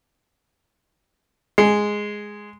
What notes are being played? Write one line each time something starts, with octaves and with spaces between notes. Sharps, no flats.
G#3